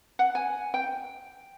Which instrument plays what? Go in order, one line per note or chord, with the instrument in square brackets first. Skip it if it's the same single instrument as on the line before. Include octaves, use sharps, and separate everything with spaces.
[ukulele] F#5
G#5
G5